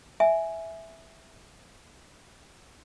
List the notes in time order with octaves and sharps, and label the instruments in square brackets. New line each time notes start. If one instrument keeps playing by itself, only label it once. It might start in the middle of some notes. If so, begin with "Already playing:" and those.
[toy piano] E5 G#5